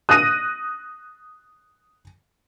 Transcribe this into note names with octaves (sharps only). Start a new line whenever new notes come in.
D#6 F#6 A#6 D#7